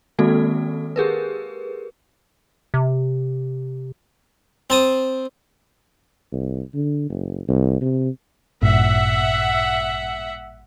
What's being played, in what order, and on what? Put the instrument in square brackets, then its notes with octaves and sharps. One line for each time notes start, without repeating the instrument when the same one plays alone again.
[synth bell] D#3 G#3 A#3 C4 F#4 A4
G4 G#4 A#4 B4
[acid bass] C3
[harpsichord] C4 A5 D#6
[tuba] C2
D3
F#1
C2
C3
[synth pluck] A1 G2 A#2 [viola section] E5 F#5